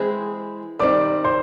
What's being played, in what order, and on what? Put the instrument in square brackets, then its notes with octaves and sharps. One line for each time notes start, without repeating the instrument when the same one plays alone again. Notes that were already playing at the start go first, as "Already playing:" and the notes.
Already playing: [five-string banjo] E3 G#3 C4 E4 G#4
[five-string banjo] D#3 G3 C4 D#4 [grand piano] D5 D6
[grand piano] C5 C6